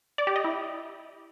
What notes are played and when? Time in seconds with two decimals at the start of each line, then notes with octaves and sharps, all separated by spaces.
0.18 D5
0.27 G4
0.36 D#5
0.44 E4